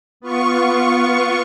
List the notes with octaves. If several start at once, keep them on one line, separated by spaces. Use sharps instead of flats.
B3 F4 C#6